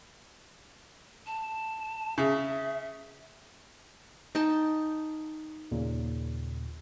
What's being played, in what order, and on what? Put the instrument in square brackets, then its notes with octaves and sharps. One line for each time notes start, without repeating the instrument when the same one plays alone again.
[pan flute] A5
[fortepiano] C#3 [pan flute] E5
[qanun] D#4 G5 A5
[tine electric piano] D#2 A#2 C#3